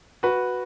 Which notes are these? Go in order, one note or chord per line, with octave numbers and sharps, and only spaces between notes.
F#4 B4